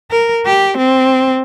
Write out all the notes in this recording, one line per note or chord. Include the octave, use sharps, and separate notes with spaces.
A#4
G4
C4